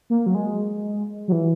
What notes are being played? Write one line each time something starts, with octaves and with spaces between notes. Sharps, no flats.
A#3
F#3
G#3
F#3
E3